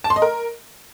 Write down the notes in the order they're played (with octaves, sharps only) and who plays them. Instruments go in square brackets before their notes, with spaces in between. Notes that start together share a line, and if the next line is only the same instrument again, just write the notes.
[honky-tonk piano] A5
C6
D#5
A#4